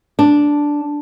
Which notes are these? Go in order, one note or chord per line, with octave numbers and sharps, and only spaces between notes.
D4